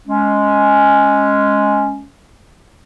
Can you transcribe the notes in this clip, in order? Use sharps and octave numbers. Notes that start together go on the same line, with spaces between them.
G#3 C#4